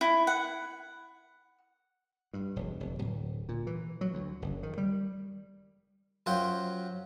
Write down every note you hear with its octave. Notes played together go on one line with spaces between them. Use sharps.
E4
F#5
G2
E1
F1
D1
A#2
E3
F#3
D2
F#1
D#3
G3
F#2 F#3 F4 C5 F#5 G5